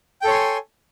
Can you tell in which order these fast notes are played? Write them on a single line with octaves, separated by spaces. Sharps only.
G5 A4 C#5 C6 G#5